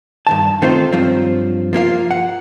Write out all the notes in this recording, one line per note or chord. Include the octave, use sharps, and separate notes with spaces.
G2 D#3 A5
D#3 A3 C4 D#4 F4 C5
G2 F3 F#3 C4
F3 A#3 F4 F5
F#5